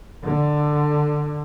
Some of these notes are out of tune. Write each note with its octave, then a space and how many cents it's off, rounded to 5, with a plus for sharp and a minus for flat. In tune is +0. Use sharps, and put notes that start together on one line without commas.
D3 +15